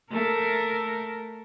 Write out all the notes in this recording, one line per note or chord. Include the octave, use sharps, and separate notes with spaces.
A3 A#4